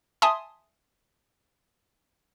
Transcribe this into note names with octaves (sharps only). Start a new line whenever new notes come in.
E5 G#5 A5 C6 D#6